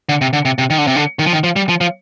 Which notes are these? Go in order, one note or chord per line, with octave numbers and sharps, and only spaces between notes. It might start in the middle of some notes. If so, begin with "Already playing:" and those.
D3
C3
D3
C3
C3
D#3
D3
C3
D3
D#3
F3
D#3
F3
G3
F3
F3